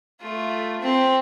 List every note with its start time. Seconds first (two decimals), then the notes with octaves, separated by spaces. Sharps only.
0.21 A3 F4
0.81 C4